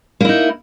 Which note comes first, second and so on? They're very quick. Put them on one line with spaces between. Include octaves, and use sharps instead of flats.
A#3 E4 D#4